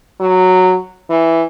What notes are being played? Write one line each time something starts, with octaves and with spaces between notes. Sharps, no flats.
F#3
E3